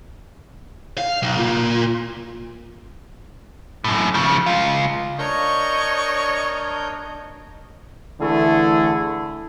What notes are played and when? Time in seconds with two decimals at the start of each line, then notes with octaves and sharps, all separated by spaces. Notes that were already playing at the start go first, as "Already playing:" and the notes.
0.98 F5
1.22 B1
1.37 A#2
3.84 F#2 A2
4.14 C#3 F3
4.46 C#2 F4
5.19 D4 A#4 C#5 D#5 C#6 G6
8.20 D3 E3 A3 E4 G#4 A4